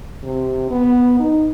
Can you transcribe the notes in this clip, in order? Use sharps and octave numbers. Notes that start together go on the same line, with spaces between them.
C3
B3
D#4